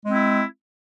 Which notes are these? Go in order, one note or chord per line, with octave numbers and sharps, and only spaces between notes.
G#3 C4 E4